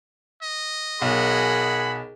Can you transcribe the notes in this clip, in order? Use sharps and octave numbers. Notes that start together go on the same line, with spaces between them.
D#5
B1 G#4 A#4 F#5 G#5 B5